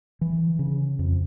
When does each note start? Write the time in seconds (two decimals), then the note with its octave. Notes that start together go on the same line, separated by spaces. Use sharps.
0.21 E3
0.59 C#3
0.99 F2